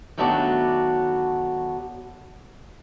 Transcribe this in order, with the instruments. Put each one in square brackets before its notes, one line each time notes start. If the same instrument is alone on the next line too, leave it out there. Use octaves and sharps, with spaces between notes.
[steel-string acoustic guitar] D#3 F#3 A3 B3 D4 F#4